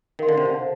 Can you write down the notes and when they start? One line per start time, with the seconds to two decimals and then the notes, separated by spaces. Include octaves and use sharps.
0.19 D#3 A#4 F5 C6
0.29 D3
0.38 C3
0.45 D3
0.54 C5 F5 A5